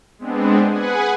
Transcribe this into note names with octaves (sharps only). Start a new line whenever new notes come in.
G#3 B3 C4 D4
G#4 B4 F#5 G#5